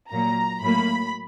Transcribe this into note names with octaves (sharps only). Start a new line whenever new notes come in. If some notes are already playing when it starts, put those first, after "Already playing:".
A#2 F#3 A#3 A#5
A2 F#3 A#3 B5